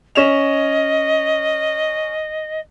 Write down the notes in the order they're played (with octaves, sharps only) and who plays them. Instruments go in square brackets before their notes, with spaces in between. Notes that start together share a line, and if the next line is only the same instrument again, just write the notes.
[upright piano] C#4 E7 F7 [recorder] D#5